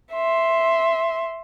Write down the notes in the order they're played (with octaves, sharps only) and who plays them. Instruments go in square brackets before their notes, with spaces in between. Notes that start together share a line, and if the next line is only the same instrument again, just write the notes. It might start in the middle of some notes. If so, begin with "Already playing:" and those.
[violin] E5 C6